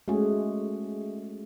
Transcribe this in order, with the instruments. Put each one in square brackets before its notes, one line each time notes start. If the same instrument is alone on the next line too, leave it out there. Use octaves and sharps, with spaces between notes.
[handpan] G#3 A3 C#4 F#4 G#4